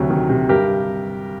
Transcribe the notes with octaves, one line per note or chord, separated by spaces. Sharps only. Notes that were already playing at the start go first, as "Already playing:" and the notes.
Already playing: D2 C3 F#3
D#3
C3
G2 G4 A#4